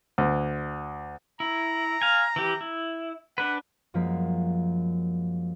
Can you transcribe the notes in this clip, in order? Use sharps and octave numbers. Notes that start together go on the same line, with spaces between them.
D2
E4 A#5
F5 G#5
E3 G4
E4
D4 B4 F#5
F#2 F3 G#3 A#3 B6